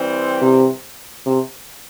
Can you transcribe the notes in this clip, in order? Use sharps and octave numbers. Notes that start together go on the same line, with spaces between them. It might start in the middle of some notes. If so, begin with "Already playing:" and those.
Already playing: E3 G3 C4
C3
C3